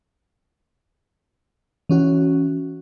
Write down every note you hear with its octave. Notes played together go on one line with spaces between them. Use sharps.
E3 C#4 F#4